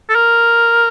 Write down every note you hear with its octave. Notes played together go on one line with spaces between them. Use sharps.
A4
A#4